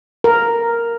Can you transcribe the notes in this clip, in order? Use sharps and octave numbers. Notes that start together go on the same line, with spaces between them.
A#4